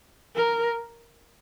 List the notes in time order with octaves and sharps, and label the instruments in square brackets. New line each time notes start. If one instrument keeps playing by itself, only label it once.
[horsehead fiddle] A#4